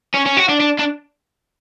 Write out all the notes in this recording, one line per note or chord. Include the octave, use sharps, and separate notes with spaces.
C#4
C#4
F#4
D4
D4
D4